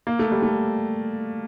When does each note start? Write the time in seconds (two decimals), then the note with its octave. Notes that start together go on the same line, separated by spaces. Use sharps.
0.07 A#3
0.19 A3
0.31 G3
0.43 A3